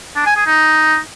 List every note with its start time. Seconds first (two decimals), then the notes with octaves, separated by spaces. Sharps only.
0.16 D4
0.26 G#5
0.36 G#4
0.46 D#4